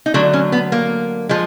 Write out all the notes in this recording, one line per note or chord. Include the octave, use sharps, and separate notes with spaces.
D#4
D3 F#3 A3 D4
C#4
B3
A#3
F3 G#3